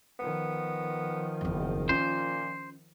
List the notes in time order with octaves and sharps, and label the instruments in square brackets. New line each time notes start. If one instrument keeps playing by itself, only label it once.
[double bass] D#3 F3 [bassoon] B3
[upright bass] F#1 E2
[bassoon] A#2 [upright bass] C#4 F4 [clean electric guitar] C5